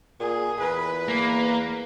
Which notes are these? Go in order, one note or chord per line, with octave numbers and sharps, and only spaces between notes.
A#2 G#4
E2 B4
A#3